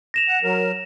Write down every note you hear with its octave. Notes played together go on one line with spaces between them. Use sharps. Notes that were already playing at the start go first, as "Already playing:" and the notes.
A#6 E7 F7
F#5
F#3 A#4